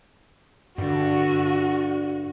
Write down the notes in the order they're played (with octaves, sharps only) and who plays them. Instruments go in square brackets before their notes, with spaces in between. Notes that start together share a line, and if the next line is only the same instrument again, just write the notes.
[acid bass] G2 [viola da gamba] D3 [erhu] F#4